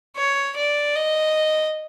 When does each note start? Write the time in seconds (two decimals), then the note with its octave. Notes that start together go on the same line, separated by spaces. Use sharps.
0.16 C#5
0.57 D5
0.95 D#5